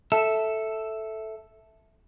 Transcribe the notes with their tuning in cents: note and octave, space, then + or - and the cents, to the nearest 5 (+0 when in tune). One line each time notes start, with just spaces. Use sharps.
A4 +0 E5 -5